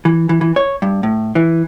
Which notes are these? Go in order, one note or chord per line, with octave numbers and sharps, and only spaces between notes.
E3
E3
E3
C#5
G2
A2
E3